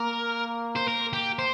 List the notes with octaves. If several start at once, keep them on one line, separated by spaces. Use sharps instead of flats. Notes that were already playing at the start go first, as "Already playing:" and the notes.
Already playing: A#3 A#4
C5
A#4
G4
C5